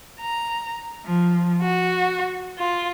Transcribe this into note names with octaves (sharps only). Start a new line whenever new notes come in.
A#5
F3
F#4
F4